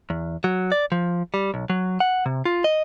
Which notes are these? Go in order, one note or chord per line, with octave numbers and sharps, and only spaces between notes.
E2
F#3
D5
F3
G3
B1
F#3
F#5
C3
F4
D#5